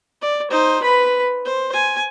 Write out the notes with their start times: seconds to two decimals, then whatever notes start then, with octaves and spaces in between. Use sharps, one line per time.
0.22 D5
0.51 D#4 C5
0.82 B4 B5
1.45 C5
1.74 G#5